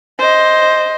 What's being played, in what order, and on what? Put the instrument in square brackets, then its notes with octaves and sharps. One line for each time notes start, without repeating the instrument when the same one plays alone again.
[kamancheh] C5 D#5